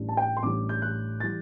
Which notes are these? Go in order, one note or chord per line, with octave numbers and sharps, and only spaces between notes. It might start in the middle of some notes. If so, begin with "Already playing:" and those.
Already playing: A1 A2 G3 D4
A5
G5
C6
A1 A2 G3 D4 D6
G6
F#6
E3 G3 A6